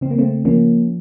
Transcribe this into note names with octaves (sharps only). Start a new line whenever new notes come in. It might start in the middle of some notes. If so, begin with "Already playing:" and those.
C#3 C4
A#3
A3 C4
F3 A#3 C#4